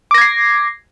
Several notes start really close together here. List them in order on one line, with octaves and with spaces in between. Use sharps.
D6 A#6 G#6 C7